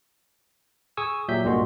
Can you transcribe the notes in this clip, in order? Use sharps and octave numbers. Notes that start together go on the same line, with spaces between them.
G#4 G#5 C#6 D#6 E6
A#2 F#3 G4 E5 G6 B6
C2 G2 A#2 G#3 F#4 C6